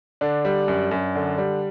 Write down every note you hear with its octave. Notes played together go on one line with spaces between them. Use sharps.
D3 D4
G3
F#2
F#2
D3
G3